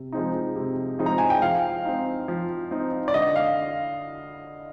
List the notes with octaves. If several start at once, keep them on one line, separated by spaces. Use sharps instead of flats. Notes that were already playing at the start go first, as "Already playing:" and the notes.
Already playing: C3
F3 G#3 C4 D#4
C3
F3 G#3 C4 D#4
A#5
G#5
G5
F3 F5
C4 D#4
F3
C4 D#4
D5
D3 D#5
F5